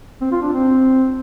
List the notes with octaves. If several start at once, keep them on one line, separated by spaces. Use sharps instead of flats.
C4
F4
D4
C4